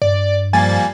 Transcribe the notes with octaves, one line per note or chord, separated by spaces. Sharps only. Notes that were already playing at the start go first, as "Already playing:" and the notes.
G2 D5
F3 G3 A#3 G#5 A6